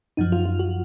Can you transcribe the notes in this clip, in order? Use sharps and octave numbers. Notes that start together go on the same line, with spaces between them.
F#2 F3 D#4
F4
F4
F#4